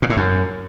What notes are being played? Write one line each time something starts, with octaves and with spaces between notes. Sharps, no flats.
A#2
A2
F#2